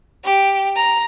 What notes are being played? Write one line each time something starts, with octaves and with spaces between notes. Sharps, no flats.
G4
A#5